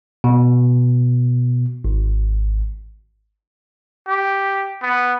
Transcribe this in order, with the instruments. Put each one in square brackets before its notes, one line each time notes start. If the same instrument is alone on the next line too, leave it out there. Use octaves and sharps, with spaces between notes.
[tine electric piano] B2
G#1
[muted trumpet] G4
B3